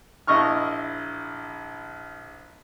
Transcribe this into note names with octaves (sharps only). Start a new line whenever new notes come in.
A#1 E4 D#5 C#6 F6